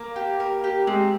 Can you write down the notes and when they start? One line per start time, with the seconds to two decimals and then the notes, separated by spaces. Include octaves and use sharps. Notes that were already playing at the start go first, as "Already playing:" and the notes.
Already playing: A#3 A#4
0.16 G4
0.40 A#4
0.64 G4
0.87 G#3 C4